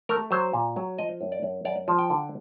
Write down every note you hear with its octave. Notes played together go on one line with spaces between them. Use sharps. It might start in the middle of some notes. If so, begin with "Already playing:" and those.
A3 A#4
F#3 C5
A#2
F#3
F3 D#5
F#2
D5
F#2
F#2 D5
F3
G5
D3